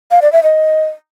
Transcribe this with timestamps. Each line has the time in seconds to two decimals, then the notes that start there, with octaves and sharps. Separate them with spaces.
0.11 F5
0.22 D5
0.33 E5
0.43 D#5